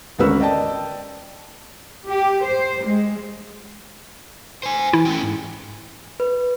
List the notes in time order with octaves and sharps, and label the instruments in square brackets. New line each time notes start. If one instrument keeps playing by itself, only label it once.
[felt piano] G#1 D2 C#4 A#4 B4 E6
D5 D#5 G5 A5
[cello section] G4
C5
G#3
[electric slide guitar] C5 G#5
[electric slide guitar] E3 [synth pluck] E4
[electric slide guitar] A3 C#4 G5
G#2
[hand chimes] B4